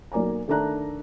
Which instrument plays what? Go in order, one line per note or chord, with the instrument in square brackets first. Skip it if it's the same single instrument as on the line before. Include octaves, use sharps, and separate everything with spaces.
[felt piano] B1 A#3 D5 G#5 A#5
D#3 A3 D4 E5 A#5 F#6